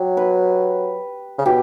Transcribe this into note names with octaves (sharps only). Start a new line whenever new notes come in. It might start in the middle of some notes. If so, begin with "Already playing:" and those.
Already playing: F#3 G4
B4
C#3
B2 G4